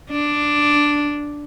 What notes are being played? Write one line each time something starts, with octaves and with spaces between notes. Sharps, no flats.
D4